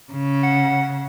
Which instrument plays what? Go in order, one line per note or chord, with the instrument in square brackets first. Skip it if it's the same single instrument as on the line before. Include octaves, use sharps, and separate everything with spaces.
[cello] C#3
[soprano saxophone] F#5